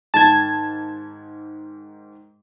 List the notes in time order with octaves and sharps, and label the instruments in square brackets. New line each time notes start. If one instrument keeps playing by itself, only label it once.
[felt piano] G#2 D#3 [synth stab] A5 G#6